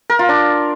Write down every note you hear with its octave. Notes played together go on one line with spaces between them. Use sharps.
A#4
F4
D4